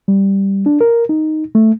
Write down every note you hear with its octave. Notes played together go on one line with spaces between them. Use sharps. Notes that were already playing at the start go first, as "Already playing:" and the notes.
G3
D4
A#4
D#4
A3